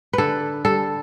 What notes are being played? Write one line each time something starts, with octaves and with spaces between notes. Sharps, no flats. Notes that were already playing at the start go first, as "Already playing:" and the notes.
D3 A4 B4
G3 A4